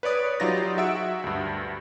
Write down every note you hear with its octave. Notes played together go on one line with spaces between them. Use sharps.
B4 C#5 D5 D#6
F#3 D#4 F4 G4 A6 A#6
F#4 G#4 E5 F#5 E6 D7
D2 G2